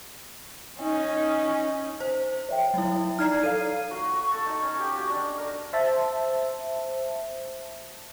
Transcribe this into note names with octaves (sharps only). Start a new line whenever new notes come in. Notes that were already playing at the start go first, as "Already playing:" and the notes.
C#4 D#4
C5
C#5 E5 G5
F#3 E4
D#4 D5 A#5 F6 G#6 C7
A4 C#5 F5 C7 D#7
F#4
F#4
C#6
A4
D#4
C#4
G4
F#4
D4
A#4
C5 E5 A5